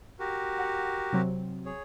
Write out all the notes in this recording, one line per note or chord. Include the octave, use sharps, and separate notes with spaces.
F#4 G4 A#4
F#5
C3 F#3 C4
G#4 C#5